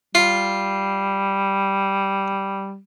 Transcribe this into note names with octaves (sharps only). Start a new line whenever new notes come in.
G3 F4